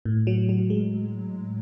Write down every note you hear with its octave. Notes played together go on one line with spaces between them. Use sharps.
A2
F#3
F#3
G#3